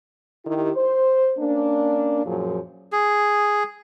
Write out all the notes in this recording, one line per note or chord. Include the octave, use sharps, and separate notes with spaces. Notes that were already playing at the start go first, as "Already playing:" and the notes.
D#3 E4 G4
C5
A#3 C#4 D4
F#2 A#2 F3 F#3 G#4
G#4